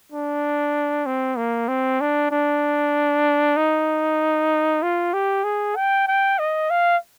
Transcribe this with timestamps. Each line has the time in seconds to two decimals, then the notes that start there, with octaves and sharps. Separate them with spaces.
0.12 D4
1.06 C4
1.37 A#3
1.68 C4
2.01 D4
2.31 D4
3.57 D#4
4.83 F4
5.14 G4
5.44 G#4
5.76 G5
6.08 G5
6.39 D#5
6.70 F5